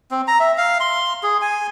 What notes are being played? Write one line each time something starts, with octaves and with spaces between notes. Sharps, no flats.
C4
A#5
E5
F5
C6
G#4
G#5